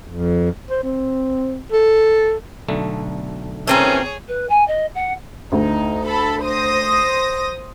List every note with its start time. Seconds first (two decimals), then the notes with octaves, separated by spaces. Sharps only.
0.08 F2
0.70 C5
0.83 C4
1.72 A4
2.68 B1 D3 A3
3.67 A#2 D#3 E3 C4 C#4 G#4 A4 C#5
4.28 B4
4.49 G#5
4.68 D#5
4.95 F#5
5.52 D2 D#4
6.05 A4 B5
6.44 C5 D#6 A#6